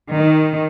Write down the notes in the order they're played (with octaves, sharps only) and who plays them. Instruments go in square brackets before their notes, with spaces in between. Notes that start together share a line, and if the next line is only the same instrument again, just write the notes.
[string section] D#3